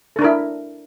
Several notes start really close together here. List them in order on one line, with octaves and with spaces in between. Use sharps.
A4 D4 A#4 E4